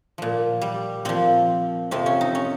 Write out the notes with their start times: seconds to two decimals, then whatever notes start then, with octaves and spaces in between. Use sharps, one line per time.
0.18 A#2 F3
0.61 G3
1.05 A#2 F3 C4
1.91 F2 C3 F3 C4
2.06 C#4
2.21 D#4
2.35 C#4